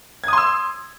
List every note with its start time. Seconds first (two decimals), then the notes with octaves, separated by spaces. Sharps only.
0.24 G#6
0.28 D#6
0.33 C6
0.38 E6